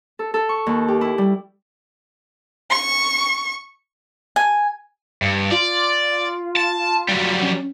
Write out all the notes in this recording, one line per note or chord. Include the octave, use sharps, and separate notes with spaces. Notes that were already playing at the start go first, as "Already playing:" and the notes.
A4
A4
C#6
D#2
G4
E4
G3
C#6
G#5
G2
F4 D5
A5
F#3 G3
C#4